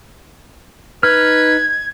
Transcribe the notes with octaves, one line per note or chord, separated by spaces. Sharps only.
D#4 B4 F6 G#6